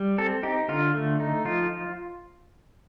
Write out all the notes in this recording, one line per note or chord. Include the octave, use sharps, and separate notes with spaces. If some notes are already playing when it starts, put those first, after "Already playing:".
Already playing: G3
C4 A4
D#4 G4
D3 F4
A3
D#4
F3 F4